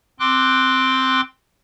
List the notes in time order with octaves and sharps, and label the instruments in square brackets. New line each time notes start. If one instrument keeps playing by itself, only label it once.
[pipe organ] C4 G5 C6 D6 F#6